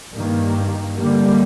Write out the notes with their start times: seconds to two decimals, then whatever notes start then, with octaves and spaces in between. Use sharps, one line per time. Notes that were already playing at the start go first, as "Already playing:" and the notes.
0.13 G2 D#3 A#3
0.94 D3 G3 A#3